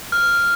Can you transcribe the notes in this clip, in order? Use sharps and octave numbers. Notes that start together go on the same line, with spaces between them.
F6